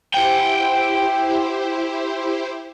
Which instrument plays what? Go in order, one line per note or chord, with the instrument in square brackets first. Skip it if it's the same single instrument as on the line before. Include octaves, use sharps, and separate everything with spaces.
[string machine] E4 G4 C5 [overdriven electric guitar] F#5 G5